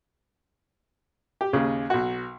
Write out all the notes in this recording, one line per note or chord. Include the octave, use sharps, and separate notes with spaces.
G4
D#2 C#3
B1 F#4